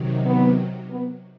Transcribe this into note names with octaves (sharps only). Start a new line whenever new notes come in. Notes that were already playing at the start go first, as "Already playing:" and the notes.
Already playing: C3 D#3 F#3
B3
B3